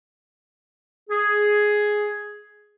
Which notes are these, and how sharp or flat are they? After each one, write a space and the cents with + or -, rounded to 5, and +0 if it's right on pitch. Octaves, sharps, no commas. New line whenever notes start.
G#4 +5